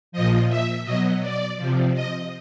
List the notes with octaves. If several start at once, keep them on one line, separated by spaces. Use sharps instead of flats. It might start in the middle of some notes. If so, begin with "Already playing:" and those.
A#2 F3 D#5
E5
B2 F#3 D#5
D5
C3 F3
D#5